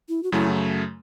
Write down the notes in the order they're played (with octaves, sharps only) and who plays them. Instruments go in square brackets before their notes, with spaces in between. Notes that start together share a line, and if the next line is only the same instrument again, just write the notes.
[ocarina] E4
F#4
[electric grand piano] F#2 C#3 F#3 A3 [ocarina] E4